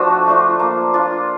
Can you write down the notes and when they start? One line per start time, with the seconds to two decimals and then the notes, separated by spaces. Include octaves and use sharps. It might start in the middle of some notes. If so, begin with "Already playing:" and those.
Already playing: F3 A3 D4 F#4
0.27 A3 D4 F4
0.59 A#3
0.94 D4 F4